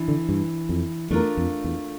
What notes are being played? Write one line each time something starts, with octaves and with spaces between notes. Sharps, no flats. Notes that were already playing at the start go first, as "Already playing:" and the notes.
Already playing: E3 D4
D3
G2
F2
E2 A3 D4 F4 A#4
F2
E2